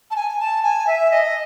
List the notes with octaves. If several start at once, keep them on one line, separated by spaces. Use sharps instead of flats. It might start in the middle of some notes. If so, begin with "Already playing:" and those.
A5
G#5
A5
G#5
E5
D#5